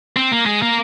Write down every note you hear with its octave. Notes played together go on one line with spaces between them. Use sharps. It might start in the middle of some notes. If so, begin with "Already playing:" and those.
C4
A#3
G#3
A#3